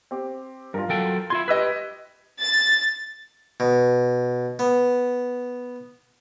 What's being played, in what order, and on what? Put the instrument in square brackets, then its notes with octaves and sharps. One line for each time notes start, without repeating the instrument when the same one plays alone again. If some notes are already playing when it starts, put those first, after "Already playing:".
[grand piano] C4 G4
[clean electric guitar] G2 [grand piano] F4 A#4
[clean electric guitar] F#3 A4 G5
[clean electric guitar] E4 F4 C6 [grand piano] G#6
[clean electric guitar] G4 B4 [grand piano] D#5 E6 B6
[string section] A6
[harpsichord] B2
B3